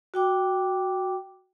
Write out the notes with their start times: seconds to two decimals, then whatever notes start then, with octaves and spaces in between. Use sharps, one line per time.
0.14 F#4 G5 D6